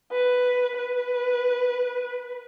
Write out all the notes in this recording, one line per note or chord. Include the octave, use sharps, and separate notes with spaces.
B4
B4